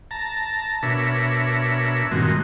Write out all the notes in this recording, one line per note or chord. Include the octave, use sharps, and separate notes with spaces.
A5 A#5
B2 D4 A#4 C#5 E5 B5
G2 A#2 D#3 G#3 C4 F#4